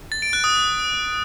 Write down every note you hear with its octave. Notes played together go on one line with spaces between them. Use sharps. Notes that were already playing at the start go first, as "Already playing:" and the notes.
A6
D7
F#6
D#6